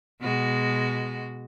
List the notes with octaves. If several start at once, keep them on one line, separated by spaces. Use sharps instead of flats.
B2 G#3 F#4